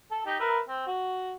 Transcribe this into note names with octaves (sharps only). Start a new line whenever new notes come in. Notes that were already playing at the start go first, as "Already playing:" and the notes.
A4
D#4 G4
A#4 B4 E5
C4
F#4